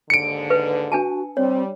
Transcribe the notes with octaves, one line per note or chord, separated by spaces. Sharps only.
D#2 G#2 D3 C#7 D7
B4
D4 F#4 G#5 A5
G3 C4 C#5